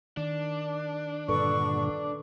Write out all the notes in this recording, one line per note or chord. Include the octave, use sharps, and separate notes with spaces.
D#3 D4
G2 A#2 D3 A4 B4 D5 C#6